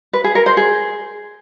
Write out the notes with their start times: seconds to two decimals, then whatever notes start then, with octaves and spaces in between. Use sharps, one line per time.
0.13 B4
0.24 G#4
0.35 A#4
0.46 C5
0.57 G#4